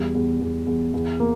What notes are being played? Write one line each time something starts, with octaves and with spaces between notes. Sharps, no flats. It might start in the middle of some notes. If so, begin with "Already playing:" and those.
Already playing: E2 G3
E2
E2
E2
E2
A#3